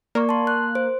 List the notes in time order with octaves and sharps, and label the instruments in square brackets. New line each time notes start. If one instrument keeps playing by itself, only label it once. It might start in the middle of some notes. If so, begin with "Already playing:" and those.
[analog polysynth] A#3 [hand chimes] D5 C#6
[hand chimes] A5 C6
F#6
C5